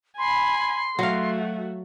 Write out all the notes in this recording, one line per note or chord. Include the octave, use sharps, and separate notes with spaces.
G#5 B5 C6
F#3 A3 F#4 F5